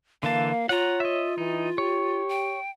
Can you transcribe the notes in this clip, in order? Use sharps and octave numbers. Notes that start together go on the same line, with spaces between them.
D3 E3 A#3 F5 A5
F4 C#5 F#5 A#5
D#5 E5
E3 D#4
G4 C#5
G5